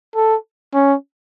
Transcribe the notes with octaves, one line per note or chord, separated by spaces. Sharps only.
A4
C#4